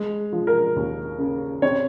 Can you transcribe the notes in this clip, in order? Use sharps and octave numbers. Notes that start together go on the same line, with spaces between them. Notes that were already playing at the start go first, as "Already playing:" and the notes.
Already playing: G#3
F3
A#4
D#2
C#3
C4 C#5